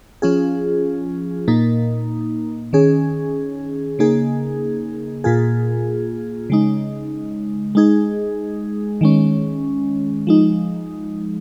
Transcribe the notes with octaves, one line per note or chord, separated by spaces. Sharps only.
F3 C#4 F4 G#4
A#2 A#3 D#4
D#3 C#4 G#4
C#3 A#3 D#4 G#4
A#2 A#3 F4 G#4
C#3 G#3 D#4
G#3 D#4 G#4
D#3 G#3 C#4
F3 G#3 D#4